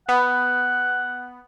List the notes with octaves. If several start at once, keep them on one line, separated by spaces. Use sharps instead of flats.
B3 F#5